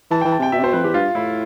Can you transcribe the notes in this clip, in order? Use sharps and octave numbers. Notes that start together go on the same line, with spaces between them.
E3 A5
G5
E3
A5
C3 G5
B2 E5
C3
B2 C5
F2 B4
E2 G4
G2 F4
A2 E4